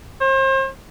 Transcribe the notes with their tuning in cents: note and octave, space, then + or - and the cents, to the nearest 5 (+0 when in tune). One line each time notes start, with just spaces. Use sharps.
C5 +40